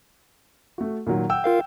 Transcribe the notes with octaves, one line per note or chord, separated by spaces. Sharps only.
A3 F#4
A#2 D#3 F#3
F#5 G5 E6
F4 A#4 F5